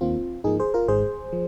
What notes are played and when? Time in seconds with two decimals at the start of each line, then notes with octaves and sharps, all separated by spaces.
0.01 D#2 D#3 A#3 C4 F4
0.44 G#2 F3 A#3 D#4 G#4
0.60 G#4 C5
0.74 F4 A#4
0.88 G#1 G#2 G#3 G#4 C5
1.32 F3